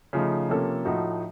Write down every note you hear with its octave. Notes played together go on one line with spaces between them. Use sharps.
C#3 F3 A3 D#4
C3 F3 A#3 C#4 A4
A2 F3 A3 D#4 F#4